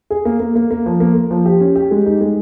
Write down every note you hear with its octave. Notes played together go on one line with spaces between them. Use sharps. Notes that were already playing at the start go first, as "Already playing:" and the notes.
G#4
A#3
A#3
A#3
A#3
F3
A#3
A#3
F3
G4
C#4
G4
G#3
D#4
G#3